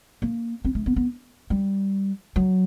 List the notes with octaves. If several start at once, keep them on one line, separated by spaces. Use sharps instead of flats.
A#3
C4
A3
B3
B3
G3
F#3